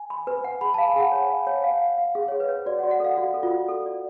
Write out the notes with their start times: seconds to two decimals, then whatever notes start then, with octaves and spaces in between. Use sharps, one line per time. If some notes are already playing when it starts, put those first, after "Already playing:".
Already playing: G#5
0.10 B5
0.27 B4
0.44 F#5
0.61 G#4 B5
0.74 F5 A5
0.87 G#5
0.96 G#4 F#5
1.12 C#5
1.30 F5
1.47 C#5
1.64 F5
1.81 F5
1.98 F5
2.15 G#4 F5
2.28 G#4 C#5
2.40 B4
2.48 C#5
2.66 F#4 D5
2.79 F#5
2.83 F#4
2.91 F#5
3.00 A4 F5
3.17 F#4 D5
3.34 A4
3.43 F4
3.51 F#5
3.68 A4
3.86 D5